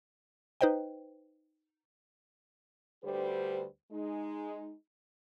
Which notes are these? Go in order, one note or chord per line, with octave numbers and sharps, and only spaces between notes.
D#4 B4 C5 D#5 G5
D2 D3 G3 G4 B4 C5
G#3 D#4